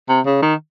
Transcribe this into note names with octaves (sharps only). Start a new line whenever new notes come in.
C3
C#3
D#3